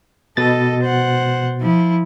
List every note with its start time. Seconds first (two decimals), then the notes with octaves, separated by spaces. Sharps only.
0.37 B2 A4 D#5 A6
0.82 C5 F#5
1.60 F3 E4